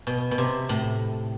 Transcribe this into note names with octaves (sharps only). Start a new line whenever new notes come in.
B2
B2
C3
A2